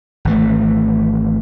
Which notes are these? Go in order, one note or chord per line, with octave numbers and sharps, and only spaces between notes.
G#1 E3 A3